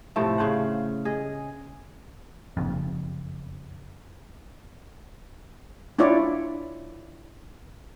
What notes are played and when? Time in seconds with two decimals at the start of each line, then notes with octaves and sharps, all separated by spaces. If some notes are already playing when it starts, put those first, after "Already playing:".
0.16 A2 C3 F3 A3
0.38 C#3 C5 F#5
1.05 G#4 D#5
2.57 F#1 F2
5.99 D4 E4 F4 C#5 D5